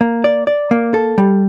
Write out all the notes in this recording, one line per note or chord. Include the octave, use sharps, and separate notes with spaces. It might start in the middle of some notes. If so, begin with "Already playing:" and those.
A#3
D5
D5
A#3
A4
G3